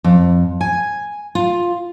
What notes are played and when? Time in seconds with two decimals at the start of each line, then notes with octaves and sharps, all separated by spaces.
0.04 F2
0.61 G#5
1.35 F4